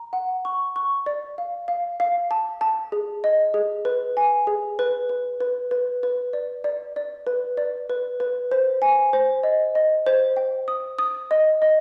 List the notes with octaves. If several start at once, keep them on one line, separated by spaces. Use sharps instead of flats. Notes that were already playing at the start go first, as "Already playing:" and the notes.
Already playing: A#5
F#5
C#6
C#6
D5
F5
F5
F5
A5
A5
G#4
D#5
G#4
B4
G#5
G#4
B4
B4
B4
B4
B4
D5
D5
D5
B4
D5
B4
B4
C5
G#5
C5
D#5
D#5
C5
G5
D#6
D#6
D#5
D#5